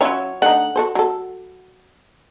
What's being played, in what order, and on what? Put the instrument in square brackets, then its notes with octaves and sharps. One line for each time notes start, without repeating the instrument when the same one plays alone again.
[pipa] F#3 C#5 [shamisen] C#4 E4 F4
[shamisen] D3 A3 D#4 [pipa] F#5
[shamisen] F#4 A4 C5
F#3 A4